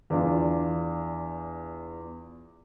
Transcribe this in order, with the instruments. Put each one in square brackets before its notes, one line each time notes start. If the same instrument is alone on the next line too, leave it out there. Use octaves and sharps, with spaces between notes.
[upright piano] E2 D4 F4